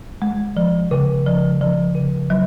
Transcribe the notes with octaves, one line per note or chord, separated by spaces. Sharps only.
G#3
F3
C#3
F3
F3
C#3
F#3